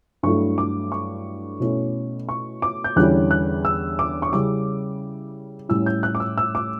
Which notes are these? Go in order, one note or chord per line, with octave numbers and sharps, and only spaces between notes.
G2 F#3 A3 E4 C#6
D6
C#6
B2 A3 C#4 E4
C#6
D6
G6
E2 D3 G3 C#4 E4 F#6
F#6
E6
D6
C#6
C#3 G3 C#4 E4 D6
A2 G3 C#4 E4 E6
G6
F#6
D6
E6
E6
D6